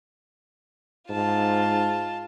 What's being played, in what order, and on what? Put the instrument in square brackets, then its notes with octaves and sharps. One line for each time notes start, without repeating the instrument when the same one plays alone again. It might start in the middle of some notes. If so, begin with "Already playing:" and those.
[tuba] G#2 [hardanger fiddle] F4 A5